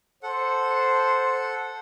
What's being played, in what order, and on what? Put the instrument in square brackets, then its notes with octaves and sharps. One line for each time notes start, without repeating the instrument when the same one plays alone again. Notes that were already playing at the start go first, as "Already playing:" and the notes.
[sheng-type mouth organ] A4 F#5 [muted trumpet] C5